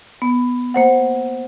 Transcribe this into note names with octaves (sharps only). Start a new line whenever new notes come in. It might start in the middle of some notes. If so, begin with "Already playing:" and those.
B3
A#3 C5 F#5